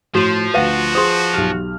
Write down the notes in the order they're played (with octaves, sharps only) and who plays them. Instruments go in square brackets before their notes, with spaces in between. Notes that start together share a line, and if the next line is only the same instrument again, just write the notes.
[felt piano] A2 [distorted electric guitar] F3 [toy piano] F#4 [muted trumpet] C5
[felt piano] D2 A#6 D#7 [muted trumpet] F#4 [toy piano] B4 F5 F#5
[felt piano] G#4 C5 [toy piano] C6 D#6
[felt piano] B1 G4 F6